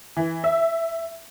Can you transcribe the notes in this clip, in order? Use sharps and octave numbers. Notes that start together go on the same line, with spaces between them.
E3
E5